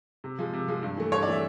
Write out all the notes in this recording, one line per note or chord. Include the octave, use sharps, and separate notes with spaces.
C3
F3 G#3
C3
F3 G#3
G2
E3 A3
G2 C#5
D5
E3 A3 E5